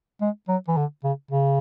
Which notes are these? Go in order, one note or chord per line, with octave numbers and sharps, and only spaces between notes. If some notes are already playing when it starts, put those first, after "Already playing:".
G#3
F#3
E3
D3
C#3
C#3